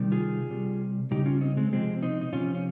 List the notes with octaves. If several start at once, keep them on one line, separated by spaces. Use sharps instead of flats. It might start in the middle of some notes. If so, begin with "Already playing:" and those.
Already playing: C3 D#3 G3
F4 G#4
C3 G3
C#3 G3 D#4 G4
C#4 F4
C4 D#4
G#3 C4
C3 F3 G#3 C4
C4 D#4
D#4
C3 F3 C#4 F4
C#4